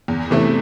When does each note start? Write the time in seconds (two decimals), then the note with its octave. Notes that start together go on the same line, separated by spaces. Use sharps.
0.08 E2
0.30 C3 E3 A3 E4